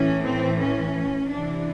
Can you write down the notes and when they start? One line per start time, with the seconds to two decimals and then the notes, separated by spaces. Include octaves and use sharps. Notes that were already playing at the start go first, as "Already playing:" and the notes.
Already playing: A2 E3 C#4
0.24 C4
0.60 C#4
1.32 C3 E3 D4